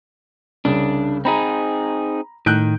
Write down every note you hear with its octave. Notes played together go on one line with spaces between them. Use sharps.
C2 C#3 D4
C4 D#4 G#4 A#5 B5
A2 D#3 F#6 G6 D7